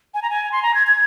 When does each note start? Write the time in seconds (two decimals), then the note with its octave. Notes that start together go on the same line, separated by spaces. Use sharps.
0.14 G#5
0.22 A#5
0.30 G#5
0.52 C6
0.63 A#5
0.74 G#6
0.87 G#6